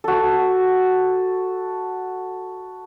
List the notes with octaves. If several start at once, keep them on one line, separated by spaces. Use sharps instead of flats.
F#4 A4